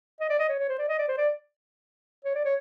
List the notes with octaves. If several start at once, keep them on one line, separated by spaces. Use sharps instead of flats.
D#5
D5
D#5
C#5
C#5
C5
D5
D#5
D5
C5
D5
C#5
D5
C#5